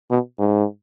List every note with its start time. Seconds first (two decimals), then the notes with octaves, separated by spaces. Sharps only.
0.10 B2
0.39 G#2